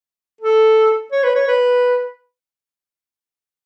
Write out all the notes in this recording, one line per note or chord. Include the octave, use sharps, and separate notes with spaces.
A4
C#5
B4
C#5
B4